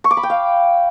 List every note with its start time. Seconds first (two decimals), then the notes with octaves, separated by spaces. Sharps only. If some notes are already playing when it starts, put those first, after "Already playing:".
0.04 C#6
0.11 D6
0.17 B5
0.23 G5
0.30 F5